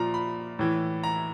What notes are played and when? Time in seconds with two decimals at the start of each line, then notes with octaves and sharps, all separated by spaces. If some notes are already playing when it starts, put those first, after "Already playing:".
Already playing: A#2 F3 A#5
0.14 B5
0.59 A2 E3
1.04 A#5